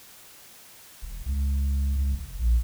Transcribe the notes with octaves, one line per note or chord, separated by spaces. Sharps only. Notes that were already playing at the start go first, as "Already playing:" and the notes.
E1
C#2
C#2
F1
A#1